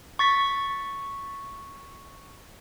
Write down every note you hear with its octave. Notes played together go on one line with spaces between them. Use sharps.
C#6 A6 B6